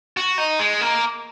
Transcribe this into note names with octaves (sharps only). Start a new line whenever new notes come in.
F#4
D#4
G#3
A#3